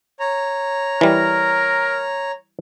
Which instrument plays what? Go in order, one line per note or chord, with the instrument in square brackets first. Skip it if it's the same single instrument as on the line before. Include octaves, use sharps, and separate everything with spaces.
[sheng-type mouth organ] C#5 A#5
[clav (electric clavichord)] E3 G3 [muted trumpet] A#4